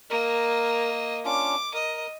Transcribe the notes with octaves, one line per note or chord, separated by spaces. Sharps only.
A#3 A#4 D#5
C#4 D4 F4 D6
A#4 D#5